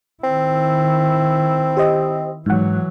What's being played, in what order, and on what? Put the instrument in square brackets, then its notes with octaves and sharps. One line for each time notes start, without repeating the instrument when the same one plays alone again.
[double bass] D#3 E4 [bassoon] C4
[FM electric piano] G4 C5 D#5
[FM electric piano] G#2 F#5 [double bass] E3 F#3